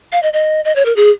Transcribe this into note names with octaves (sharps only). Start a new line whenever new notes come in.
F5
D#5
D#5
D#5
C#5
A#4
G#4